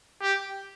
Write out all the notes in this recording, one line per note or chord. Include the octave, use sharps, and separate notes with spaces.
G4